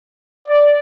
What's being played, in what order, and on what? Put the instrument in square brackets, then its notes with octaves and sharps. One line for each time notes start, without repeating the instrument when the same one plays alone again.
[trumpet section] D5